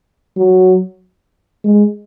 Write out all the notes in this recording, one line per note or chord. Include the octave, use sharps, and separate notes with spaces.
F#3
G#3